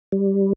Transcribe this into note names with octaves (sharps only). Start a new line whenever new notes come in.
G3